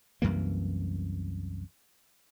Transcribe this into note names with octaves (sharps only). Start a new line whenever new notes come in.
C2 F#2 E3 A#3